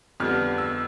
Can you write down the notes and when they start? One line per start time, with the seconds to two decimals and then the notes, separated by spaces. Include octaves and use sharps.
0.20 F2 D3 G3 B3 D4 F6
0.58 E6